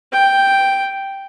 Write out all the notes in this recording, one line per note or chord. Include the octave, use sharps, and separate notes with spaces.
G5